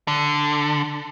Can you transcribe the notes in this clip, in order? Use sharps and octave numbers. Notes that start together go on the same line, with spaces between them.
D3